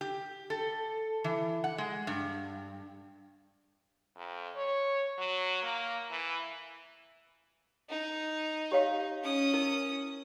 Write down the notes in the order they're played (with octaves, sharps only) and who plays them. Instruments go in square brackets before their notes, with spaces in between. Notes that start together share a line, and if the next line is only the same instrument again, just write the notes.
[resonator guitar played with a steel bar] G4
A4
E3
F#5
G#3
G2
[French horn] F2
C#5
F#3
A#3
E3
[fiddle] D#4
[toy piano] G4 C#5 F5
[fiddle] C#4 D#6
[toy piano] E4 A#4